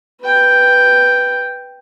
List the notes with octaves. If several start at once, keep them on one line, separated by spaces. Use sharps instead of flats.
B4 G5